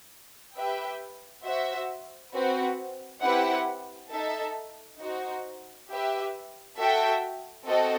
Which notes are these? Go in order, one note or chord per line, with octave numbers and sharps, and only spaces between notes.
G4 B4 E5 G5
F#4 C5 E5
C4 F#4 B4
C4 E4 G4 B4 F#5
D#4 A4 E5 A5
D#4 F#4 C5
G4 B4 E5
F#4 A4 E5 G5
C4 F#4 A4 D#5